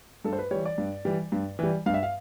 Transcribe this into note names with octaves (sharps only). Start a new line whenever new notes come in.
G2 A4
C5
B4
E3 G3 C#5
D5
G2
E3 G3
G2
E3 G3
G2 F5
E5
F5